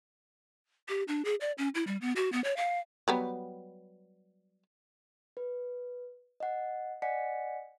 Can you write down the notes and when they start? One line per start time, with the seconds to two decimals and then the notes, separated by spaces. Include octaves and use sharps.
0.88 G4
1.08 D4
1.25 G#4
1.41 D5
1.58 C#4
1.75 E4
1.87 G3
2.01 B3
2.16 F#4
2.32 B3
2.44 C#5
2.57 F5
3.08 F#3 G3 B3
5.37 B4
6.40 D#5 F#5
7.02 D5 D#5 F#5 G#5 B6 C#7